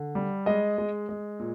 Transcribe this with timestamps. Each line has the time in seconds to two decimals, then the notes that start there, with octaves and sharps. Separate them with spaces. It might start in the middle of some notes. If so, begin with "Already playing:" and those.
Already playing: D3
0.15 G3
0.46 G#3 D#5
0.78 G#3
1.09 G#3
1.39 A#2